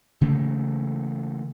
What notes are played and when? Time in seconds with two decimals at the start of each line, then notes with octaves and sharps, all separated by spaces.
0.21 C#3 E3 A3 A#3